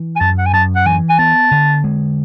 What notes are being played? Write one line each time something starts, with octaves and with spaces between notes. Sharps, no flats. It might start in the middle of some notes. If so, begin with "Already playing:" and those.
Already playing: E3
G#5
F#2 A5
F#5
G#5
F#2 A5
F#5
E3 G#5
G#5
B3 A5
D3
G#3